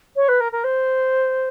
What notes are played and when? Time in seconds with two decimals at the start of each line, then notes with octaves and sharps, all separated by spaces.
0.16 C#5
0.28 B4
0.40 A#4
0.52 A#4
0.64 C5